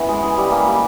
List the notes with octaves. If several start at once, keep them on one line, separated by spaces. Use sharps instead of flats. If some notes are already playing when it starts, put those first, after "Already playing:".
Already playing: E3 B3 C#4 E4
G#3
G#3
G3
A#3
G3